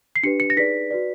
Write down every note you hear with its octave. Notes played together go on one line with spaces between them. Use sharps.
C7
D4 G4 B4 C#7
C#7
A#6
D#4 G#4 B4 D5 B6
F#4 B4 D5